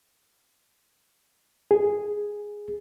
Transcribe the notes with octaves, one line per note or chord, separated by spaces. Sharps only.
G#4